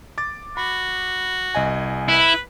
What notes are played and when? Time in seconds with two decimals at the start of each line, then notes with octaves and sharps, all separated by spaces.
0.18 D6 A6
0.57 F#4 B5
1.55 C2 D#5 G#5
2.08 E4 B4